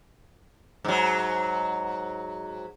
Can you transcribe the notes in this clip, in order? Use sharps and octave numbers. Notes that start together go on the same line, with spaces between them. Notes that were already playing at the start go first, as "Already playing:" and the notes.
G#2 F#3